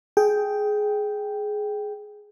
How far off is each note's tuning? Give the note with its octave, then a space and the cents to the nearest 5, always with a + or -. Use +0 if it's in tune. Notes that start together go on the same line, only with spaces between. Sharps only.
G#4 +15 G5 +0